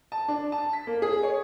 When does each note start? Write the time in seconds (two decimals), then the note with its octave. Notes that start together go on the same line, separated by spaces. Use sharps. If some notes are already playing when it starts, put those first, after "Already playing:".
0.12 A5
0.28 D4
0.52 A5
0.73 B6
0.87 A#3
1.02 G#4
1.23 C#5